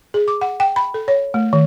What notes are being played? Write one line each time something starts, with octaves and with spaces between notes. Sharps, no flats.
G#4
D6
F#5
G5
B5
A4
C#5
A3
D#3